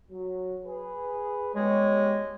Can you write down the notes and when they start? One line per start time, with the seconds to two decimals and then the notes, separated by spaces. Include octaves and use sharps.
0.11 F#3
0.65 G#4 B4
1.55 G1 G#3 G4 C#5